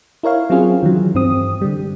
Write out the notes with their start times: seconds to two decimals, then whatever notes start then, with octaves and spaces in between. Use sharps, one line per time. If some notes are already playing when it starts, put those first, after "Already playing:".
0.23 E4 A#4 C#5 F5
0.50 F#3 C4 C#4 F4 G#4
0.83 D#3 E3 F#3
1.15 G2 C4 D#6
1.61 D3 G3